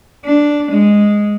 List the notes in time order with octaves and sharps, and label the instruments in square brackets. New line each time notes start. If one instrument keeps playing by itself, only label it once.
[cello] D4
G#3